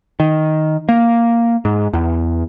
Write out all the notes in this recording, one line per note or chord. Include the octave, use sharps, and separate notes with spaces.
D#3
A#3
G#2
E2